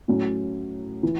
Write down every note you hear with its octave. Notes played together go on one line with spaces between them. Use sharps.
A2 F#3 C#4
E3